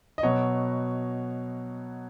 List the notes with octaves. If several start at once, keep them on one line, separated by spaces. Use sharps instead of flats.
D#5
B2 F#3 B3 C#5